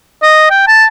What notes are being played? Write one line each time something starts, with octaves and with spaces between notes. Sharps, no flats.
D#5
G5
A5